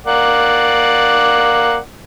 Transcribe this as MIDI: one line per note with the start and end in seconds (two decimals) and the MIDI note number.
0.06 1.78 58
0.06 1.78 74
0.06 1.78 78